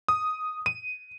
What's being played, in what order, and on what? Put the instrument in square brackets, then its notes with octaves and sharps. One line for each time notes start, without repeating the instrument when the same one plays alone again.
[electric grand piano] D#6
D#7